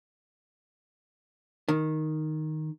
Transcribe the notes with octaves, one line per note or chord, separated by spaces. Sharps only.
D#3